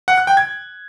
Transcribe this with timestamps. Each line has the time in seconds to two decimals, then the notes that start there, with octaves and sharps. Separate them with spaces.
0.08 F#5
0.18 F#6
0.27 G5
0.37 G#6